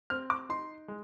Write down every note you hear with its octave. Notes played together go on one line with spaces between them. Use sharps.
C4 F6
D6
D#4 C6
G#3